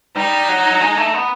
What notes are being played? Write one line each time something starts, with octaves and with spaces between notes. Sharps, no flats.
G3 D#4
F#3
G#3
A3
B3